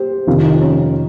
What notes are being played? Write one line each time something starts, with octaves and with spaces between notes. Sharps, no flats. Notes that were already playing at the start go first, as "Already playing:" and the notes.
Already playing: G4 C5
F2 C3 D#3 F4
D#4
C#4